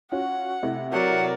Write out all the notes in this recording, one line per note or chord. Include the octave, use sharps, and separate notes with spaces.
C#4 F4 F#4 F#5
C3 A3 E4
F#3 A#4 D5 F#5